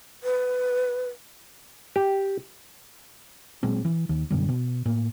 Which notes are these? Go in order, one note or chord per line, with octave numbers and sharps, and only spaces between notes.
B4
G4
A#2 F#3 G#3 C4
E3
D#2 D#3
F#2 B2 D3 G3
B2
A2 A#3